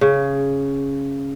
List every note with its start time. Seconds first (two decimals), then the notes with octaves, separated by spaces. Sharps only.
0.01 C#3